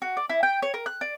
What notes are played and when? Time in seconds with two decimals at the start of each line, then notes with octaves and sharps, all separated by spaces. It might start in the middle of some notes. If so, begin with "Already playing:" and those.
0.02 F#4
0.17 D5
0.30 E4
0.43 G5
0.62 C#5
0.74 A#4
0.86 F#6
1.01 D5